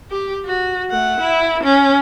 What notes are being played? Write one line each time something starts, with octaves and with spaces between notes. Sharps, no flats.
G4
F#4
A3 F#5
E4
C#4